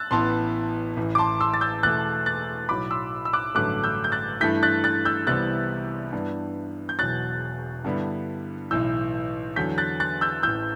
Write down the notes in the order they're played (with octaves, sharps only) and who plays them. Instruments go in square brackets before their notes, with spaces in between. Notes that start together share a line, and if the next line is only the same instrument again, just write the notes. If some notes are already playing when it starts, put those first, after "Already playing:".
Already playing: [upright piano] E6 F#6 A6
[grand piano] A1 A2 E3 B3 E4 [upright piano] A5 C6
[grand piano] A1 A2 E3
[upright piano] D6
A5 C6
C6 E6
A6
E6 G6
[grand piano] E2 B2 A3 [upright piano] F#6 A6
[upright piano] F#6 A6
[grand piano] B1 A2 F#3 [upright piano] B5 D6
[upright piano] C6 E6
E6
D6 F#6
[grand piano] A1 G2 D3 F#3 A3 [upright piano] D6 F#6
[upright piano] E6 G6
G6
F#6 A6
[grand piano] G2 E3 A3 E4 [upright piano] G6 B6
[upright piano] F#6 A6
F#6 A6
E6 G6
[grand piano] C2 C3 E3 G3 B3 [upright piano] F#6 A6
[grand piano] G2 E3 B3 D4
[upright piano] G6
[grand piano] E1 E2 B2 F#3 [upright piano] F#6 A6
[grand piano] G2 D3 G3 B3 E4
[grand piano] B1 A2 E3 [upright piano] E6 G6
[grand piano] E2 D3 F#3 [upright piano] G6 B6
[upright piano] F#6 A6
F#6 A6
E6 G6
[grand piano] A1 A2 E3 [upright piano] E6 G6